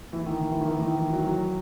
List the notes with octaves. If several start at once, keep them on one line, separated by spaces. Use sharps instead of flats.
E3
D#3
D#3
E3
D#3
E3
D#3
E3
F#3
F#3